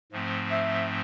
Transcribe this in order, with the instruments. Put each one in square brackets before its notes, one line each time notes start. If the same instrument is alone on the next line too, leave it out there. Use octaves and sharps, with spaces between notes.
[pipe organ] G#2 F3 A3 C4
[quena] E5